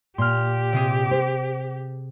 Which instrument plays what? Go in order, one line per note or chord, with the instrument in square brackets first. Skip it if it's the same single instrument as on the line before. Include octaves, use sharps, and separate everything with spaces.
[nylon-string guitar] A#2 [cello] G4 [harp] C6 F6
[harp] C3 C4 G#4
[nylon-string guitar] C5